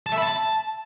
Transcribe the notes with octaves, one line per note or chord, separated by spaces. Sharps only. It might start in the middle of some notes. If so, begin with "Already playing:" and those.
A5
E5
B5
A5